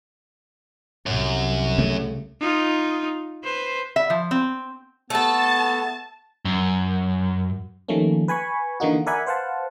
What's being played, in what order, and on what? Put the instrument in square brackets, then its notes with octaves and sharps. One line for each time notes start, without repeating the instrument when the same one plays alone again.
[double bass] C2 [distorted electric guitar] F#2
[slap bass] C#3 A3
[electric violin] D#4 F4
B4 C5
[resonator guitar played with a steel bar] E5
F3
C4
[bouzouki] A3 A4 [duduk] B3 [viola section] A5
[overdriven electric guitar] F#2
[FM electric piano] D#3 F3 G3 A3 A#3 C#4
B4 G#5 B5 C#6
D3 E3 A#3 D#4 F#4
A#4 D5 E5 F#5 G#5 B5
B4 C5 F5 F#5 A5